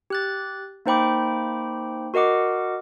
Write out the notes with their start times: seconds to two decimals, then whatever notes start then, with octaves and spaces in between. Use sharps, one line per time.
0.10 G4 F#6 A6
0.86 A#3 D#4 C5 G5 B5 D6
2.14 F#4 A#4 D#5 F#5 D6